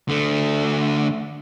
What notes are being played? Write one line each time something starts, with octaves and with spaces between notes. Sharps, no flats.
D3 A3